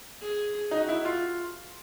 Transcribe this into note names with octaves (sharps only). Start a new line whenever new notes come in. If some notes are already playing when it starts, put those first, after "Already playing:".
G#4
D#4 F#4
E4
F4